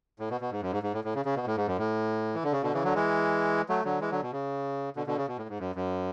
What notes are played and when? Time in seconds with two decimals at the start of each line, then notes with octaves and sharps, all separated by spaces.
0.20 A2
0.30 B2
0.41 B2
0.51 G#2
0.62 F#2
0.72 G#2
0.83 G#2
0.94 A2
1.04 A2
1.15 C#3
1.25 C#3
1.36 B2
1.46 A2
1.57 G#2
1.68 F#2
1.78 A2
2.35 E3
2.44 D3
2.53 C#3
2.63 B2 D3
2.74 C#3 E3
2.84 D3 F#3
2.95 E3 G#3
3.69 F#3 A3
3.85 D3 F#3
4.01 E3 G#3
4.11 D3 F#3
4.22 B2
4.32 C#3
4.96 B2 D3
5.07 B2 D3
5.17 C#3
5.28 B2
5.38 A2
5.49 G#2
5.60 F#2
5.75 F#2